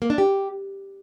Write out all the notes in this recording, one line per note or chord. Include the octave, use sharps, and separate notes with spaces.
A#3
D4
G4